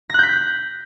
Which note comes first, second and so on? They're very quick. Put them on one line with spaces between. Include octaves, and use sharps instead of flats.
A#6 F#6 G6 B6